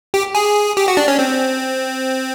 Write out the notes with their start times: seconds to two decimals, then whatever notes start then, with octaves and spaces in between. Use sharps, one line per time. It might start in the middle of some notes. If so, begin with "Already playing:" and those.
0.14 G4
0.35 G#4
0.77 G4
0.88 F#4
0.97 D4
1.08 C#4
1.19 C4